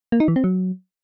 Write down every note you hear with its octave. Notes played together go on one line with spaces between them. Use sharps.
A#3
D#4
E3
C4
F#3